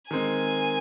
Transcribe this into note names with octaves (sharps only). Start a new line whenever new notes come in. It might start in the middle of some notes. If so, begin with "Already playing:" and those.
D#3 G#3 C4 G#5